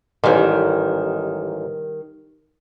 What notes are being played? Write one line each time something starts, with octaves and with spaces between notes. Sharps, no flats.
A1 G#2 D#3 G3